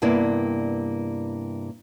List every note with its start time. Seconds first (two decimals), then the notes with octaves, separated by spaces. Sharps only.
0.02 G2 C3 A#3 B3 E4 D5